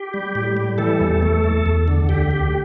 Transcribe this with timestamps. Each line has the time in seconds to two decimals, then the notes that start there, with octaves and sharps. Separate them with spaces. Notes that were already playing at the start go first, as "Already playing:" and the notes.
Already playing: G4
0.14 G3
0.35 A2
0.57 G3
0.78 E3 A4
1.00 E2
1.22 A3
1.44 E2
1.66 E2
1.88 D3
2.09 D2 G4
2.31 D2